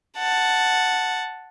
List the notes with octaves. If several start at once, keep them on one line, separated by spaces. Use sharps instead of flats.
F#5 A5